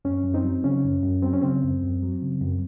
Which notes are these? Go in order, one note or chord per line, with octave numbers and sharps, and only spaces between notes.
F#2 C#4
F#2
C4 D#4
F#3
C#3 C#4
F#2
F#2
F#3 C4
C#4
C#3 C4
F#2
F#2
F#3
C#3
F#2